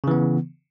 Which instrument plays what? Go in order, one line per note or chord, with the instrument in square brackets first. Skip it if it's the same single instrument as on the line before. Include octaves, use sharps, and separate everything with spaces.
[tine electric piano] C#3
E3
B3